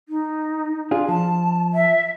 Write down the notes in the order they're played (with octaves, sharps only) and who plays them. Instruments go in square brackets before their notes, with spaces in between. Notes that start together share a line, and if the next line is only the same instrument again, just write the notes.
[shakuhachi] D#4
[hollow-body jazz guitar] D4 F4 G#4
[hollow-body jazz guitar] F3 [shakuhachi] A5
[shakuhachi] E5